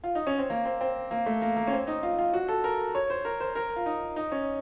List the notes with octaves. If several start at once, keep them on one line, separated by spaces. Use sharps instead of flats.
F4
D#4
C#4
C4
A#3
C4
C4
A#3
A3
A#3
A#3
C#4
C4
D#4
F4
F4
F#4
A4
A#4
C#5
C5
A#4
C5
A#4
F4
D#4
D#4
C#4